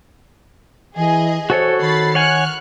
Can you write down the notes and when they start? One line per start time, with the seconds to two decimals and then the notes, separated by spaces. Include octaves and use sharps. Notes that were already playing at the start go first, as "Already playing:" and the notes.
0.96 E3 G#4 D#5
1.50 F#4 A4 C5 C#5
1.81 D#3 B5 A6 C7
2.15 C#5 F#5 G#5 F6 F#6